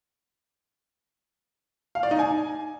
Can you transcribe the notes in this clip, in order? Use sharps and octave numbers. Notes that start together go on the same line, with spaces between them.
F5
D5
D#4
G#5